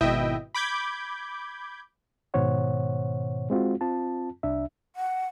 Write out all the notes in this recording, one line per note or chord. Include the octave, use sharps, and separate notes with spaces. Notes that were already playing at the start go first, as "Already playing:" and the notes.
G#1 B2 E4 D#5 E5 G5
B5 D6 G6 G#6
G#2 B2 D#3 C5 C#5 F#5
G#3 C4 F4 F#4
C4 F4 A5
C2 D4 E5
F#5